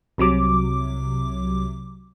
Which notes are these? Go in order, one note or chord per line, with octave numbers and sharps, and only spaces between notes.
C2 C3 F#3 D6